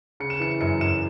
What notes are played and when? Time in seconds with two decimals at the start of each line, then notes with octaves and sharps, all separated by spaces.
0.20 C#3 C#7
0.30 E7
0.40 E3 C#7
0.61 F#2 C#7
0.81 F#2 E7